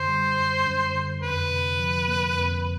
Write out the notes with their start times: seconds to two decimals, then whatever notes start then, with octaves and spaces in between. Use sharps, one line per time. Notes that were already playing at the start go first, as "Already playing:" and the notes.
Already playing: F#2 D3 C5
0.08 G3
0.37 F#2
0.66 F#2
0.94 D3
1.22 F2 B4
1.51 C3
1.79 F3
2.08 A#3
2.36 F2